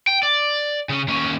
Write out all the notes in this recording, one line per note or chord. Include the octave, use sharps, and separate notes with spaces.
G5
D5
C#3 C#4
D#2 C#4